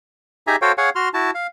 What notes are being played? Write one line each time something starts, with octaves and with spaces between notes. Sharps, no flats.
D#4 G4 G#4 E5 G#5 A#5
F#4 A4 C5 C#5 F5 G5
G#4 C#5 F5 F#5 G#5
F#4 C6 F6
E4 F#4 A5
F5